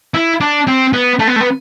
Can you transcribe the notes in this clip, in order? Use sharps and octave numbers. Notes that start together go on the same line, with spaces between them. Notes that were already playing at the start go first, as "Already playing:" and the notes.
E4
D4
C4
B3
A3
B3
A3
B3